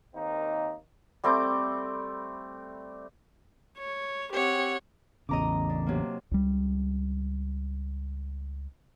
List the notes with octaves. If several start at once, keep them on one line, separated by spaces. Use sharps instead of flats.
D#2 D#3 A#3 C4 D#4
G3 A3 C4 D6
C#5
C4 G4 C#5 F#5
A1 E2 C#3 D#5 A#5 D6
D4
C3 F#3 A#3
C#2 G3